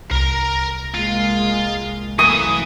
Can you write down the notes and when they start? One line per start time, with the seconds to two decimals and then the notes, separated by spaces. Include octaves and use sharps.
0.11 C2 A#4 A#5
0.95 G#3 A#3 F4
2.19 F#2 E3 A3 A#3 D#6